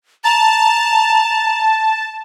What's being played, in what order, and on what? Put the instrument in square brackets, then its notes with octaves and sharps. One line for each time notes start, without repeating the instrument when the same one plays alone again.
[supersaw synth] A5 [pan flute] A#5